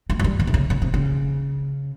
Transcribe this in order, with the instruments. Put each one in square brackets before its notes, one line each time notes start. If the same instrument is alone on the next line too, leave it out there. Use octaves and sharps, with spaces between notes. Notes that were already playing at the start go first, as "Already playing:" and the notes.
[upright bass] G#3
F#3
G3
D#3
C3
C#3
C#3
C3
C#3